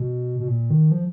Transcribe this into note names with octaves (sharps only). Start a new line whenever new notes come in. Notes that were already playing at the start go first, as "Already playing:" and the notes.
Already playing: B2
B2
A#2
D#3
F3